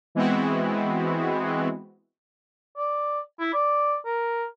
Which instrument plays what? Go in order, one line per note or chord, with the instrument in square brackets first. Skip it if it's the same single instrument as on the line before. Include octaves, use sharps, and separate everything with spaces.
[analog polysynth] E3 G#3 B3 C4 E4 F#4
[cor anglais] D5
E4
D5
A#4